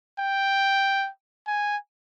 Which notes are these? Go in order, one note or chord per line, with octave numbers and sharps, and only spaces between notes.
G5
G#5